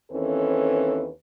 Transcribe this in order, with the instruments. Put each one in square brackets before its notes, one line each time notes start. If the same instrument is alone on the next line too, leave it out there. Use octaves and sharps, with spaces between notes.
[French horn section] D#2 E3 C4 C#4 A4 B4